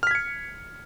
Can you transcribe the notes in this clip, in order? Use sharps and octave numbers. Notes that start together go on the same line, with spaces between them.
F6 G#6 B6 C#7